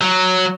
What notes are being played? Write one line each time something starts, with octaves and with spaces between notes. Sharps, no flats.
F#3